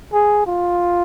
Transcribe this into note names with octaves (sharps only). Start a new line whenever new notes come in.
G#4
F4